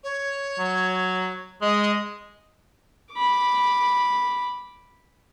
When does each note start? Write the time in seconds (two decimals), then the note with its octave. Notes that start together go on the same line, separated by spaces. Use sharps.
0.03 C#5
0.59 F#3
1.61 G#3 D#5
3.14 B5 D6